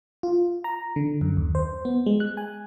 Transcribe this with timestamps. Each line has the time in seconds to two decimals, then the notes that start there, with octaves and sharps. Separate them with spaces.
0.23 F4
0.64 A#5
0.96 D3
1.21 F#2
1.37 D#2
1.55 C5
1.85 B3
2.06 G#3
2.20 F#6
2.37 G#5